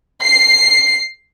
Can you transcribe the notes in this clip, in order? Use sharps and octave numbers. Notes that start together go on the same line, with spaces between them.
C7